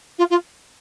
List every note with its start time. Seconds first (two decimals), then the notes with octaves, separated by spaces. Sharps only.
0.18 F4
0.30 F4